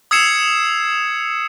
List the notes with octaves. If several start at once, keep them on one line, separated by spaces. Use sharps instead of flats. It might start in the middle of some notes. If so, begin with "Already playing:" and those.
D#6 E6 G#6 C7 C#7 E7